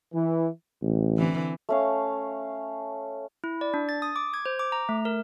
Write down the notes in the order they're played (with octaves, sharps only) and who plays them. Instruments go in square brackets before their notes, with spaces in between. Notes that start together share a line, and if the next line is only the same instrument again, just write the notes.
[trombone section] E3
[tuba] A1
[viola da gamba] D3 E3 C4
[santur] A3 C#4 F5
[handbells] E4
D5
D4
A6
D#6
D6
G#6
C5
D6
A#5
A3
A#4